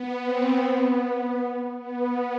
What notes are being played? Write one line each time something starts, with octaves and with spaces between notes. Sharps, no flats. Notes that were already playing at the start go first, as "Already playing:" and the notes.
Already playing: B3
C4
B3
B3